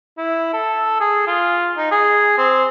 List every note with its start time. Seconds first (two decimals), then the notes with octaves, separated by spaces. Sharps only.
0.18 E4
0.53 A4
1.00 G#4
1.27 F4
1.77 D#4
1.92 G#4
2.38 C4